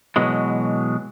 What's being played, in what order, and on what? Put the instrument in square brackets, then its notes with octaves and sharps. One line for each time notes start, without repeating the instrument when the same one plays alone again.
[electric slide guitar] B2 E3 F#3 G#3